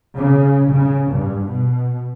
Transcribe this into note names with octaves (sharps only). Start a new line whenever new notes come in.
C#3
C#3
G2
B2